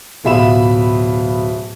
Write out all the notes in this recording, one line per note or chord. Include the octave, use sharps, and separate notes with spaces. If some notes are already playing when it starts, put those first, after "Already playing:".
D1 B2 F4 E5 B5 E7